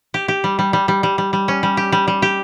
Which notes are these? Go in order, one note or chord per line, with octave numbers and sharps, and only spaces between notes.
G4
G4
G3
G3
G3
G3
G3
G3
G3
C#4
G3
G4
G3
G3
G4